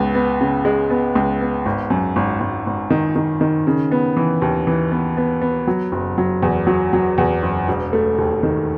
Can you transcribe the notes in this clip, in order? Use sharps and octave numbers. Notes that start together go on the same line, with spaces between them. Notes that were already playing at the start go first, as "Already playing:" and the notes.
Already playing: C#2 B3
B3
C#3
G#3
B3
C#2
B3
G#1
F#2
G#1
G#1
G#1
D#3
D#3
D#3
C#3
B3
E3
D#2
E3
B3
B3
B3
F#3
F#1
F#3
E2
F#3
F#3
E2
F#1
E1
A3
D#2
D#3